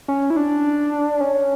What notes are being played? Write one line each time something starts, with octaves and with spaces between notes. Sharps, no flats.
C#4
E4
D4
C#4